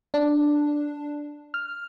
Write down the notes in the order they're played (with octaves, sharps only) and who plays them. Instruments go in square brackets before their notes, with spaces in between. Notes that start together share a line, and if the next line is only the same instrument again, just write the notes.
[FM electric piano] D4
F6